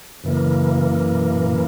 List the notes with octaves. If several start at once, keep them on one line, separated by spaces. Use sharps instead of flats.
F#2 C#3 E3 A#3
B2
A#2
B2